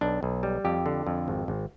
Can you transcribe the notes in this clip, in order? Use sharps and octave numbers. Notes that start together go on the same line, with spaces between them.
B1 D4
B1
G3
F2 G4
D3
F2
G#1
G#1